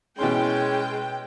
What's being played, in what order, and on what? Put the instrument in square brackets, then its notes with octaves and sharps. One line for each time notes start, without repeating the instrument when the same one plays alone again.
[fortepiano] B2 E3 C6 [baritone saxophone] G#3 [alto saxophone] C#4 [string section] G5